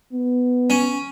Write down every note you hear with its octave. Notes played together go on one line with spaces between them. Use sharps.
B3
C#4